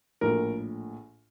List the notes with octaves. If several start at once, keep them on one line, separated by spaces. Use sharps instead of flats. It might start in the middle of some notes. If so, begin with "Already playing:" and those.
A#1 A2 A#4